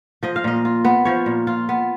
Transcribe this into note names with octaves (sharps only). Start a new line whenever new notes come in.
F3 D#5
F5
A#2 D#5
F4
B3
F3 C#5
A#2
F4
B3